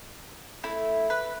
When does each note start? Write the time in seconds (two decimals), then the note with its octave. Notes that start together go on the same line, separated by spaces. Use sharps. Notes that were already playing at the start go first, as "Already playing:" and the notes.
0.63 A3 E4
1.10 B4